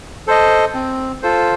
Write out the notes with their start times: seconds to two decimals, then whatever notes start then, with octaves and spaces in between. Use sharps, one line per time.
0.27 A4 C5 D#5
0.74 C4
1.22 F4 A4 C5